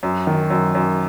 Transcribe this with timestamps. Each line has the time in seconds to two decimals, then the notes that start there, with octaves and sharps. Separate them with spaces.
0.03 F#2
0.27 D#3
0.50 F#2
0.75 F#2